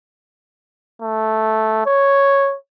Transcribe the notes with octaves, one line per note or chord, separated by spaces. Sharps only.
A3
C#5